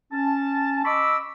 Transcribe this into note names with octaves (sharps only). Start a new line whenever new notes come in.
C#4 A5
D#5 B5 C#6 D6 E6